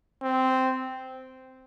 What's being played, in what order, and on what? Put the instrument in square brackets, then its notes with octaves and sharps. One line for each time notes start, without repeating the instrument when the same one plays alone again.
[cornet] C4